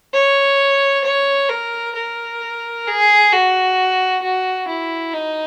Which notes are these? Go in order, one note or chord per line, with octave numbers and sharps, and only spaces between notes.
C#5
C#5
A#4
A#4
G#4
F#4
F#4
E4
D#4